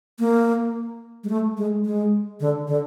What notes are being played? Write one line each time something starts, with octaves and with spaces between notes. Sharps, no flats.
A#3
G#3
A3
G#3
G#3
D3
D3